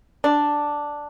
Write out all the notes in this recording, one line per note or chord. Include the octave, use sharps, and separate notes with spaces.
D4